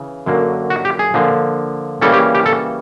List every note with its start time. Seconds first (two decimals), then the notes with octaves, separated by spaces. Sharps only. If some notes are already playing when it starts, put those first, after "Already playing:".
Already playing: C#3 E3
0.26 F#2 D3 F#3 A#3
0.70 F#4
0.85 G4
0.99 G#4
1.14 D3 F3 A#3
2.01 C#3 E3 G3 A#3 C#4 A4
2.13 G4
2.35 G4
2.46 A4